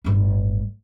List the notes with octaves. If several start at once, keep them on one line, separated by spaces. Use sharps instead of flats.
G1 A2